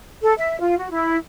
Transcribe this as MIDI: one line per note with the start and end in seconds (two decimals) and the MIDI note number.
0.22 0.33 69
0.39 0.60 76
0.60 0.78 65
0.78 0.91 66
0.91 1.16 64